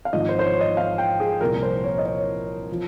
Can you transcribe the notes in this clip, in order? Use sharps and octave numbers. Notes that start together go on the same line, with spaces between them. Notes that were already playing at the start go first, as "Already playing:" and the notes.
F5
G#1 G#2 F3 D#5
C5
C5
C#5
D#5
F5
G5
G#4
C2 A#2 F3 A#4
C5
C#5
D#5
C#5
F3